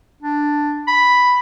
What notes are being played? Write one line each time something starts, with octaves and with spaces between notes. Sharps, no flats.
D4
B5